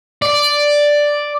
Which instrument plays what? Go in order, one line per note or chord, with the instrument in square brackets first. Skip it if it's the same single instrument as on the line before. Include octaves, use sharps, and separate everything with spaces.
[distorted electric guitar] D5